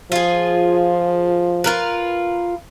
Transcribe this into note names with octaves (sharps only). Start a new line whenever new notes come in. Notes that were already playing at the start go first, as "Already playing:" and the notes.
F3 F4 G#4
F4 A#4 B4